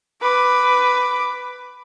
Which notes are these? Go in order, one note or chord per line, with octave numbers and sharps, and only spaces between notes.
B4 D6